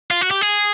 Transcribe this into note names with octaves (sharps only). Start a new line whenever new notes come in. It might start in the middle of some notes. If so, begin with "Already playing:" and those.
F4
F#4
G4
G#4